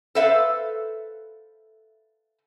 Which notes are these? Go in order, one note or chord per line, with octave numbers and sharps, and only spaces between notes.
A4 B4 C5 E5 F5